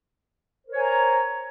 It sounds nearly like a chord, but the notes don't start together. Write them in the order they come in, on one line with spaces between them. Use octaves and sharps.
C5 A#4 C#5 G#5 A#5